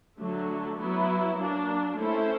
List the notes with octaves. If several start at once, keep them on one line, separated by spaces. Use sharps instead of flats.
D3 F#3 A3
F#3 B3 E4
F#3 A#3 D4
A3 C#4 E4 A4 C5